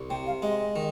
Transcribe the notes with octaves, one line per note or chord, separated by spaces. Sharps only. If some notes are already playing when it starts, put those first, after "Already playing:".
Already playing: C2
C3 G5
F5
G#3 D#5
D#3